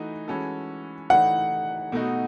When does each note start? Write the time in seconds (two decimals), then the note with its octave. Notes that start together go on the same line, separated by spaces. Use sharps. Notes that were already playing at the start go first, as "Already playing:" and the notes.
Already playing: E3 A3 D#4 F#4
0.28 E3 G#3 C#4 F#4 A4
1.10 E3 A3 D#4 F#5
1.92 B2 A3 D#4 F#4